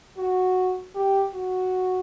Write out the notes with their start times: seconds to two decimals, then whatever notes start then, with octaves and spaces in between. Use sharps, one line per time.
0.18 F#4
0.95 G4
1.34 F#4